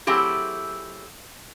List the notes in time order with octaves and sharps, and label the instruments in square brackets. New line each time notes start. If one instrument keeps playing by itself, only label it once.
[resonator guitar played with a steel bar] F#3 A3 C4 E4 G4 G#4